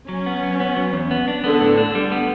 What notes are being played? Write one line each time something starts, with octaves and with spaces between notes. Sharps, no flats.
F#3 C#4
B3
F#3
B3
F#3
E2
B3
D4
D3 B3
A2
D4
G3
B3